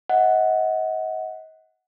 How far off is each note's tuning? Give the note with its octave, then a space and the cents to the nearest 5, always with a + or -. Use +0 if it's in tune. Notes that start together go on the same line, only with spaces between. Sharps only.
D#5 +35 F#5 +0